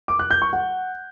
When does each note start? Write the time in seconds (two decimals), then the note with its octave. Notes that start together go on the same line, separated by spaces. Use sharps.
0.08 D6
0.19 F#6
0.31 G6
0.42 C#6
0.53 F#5